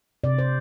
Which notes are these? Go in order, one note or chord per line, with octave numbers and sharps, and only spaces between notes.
C3 D5
C5